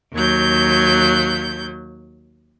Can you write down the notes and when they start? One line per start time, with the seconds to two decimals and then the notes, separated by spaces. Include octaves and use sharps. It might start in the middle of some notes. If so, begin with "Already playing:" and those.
0.14 D#2 F#3 G6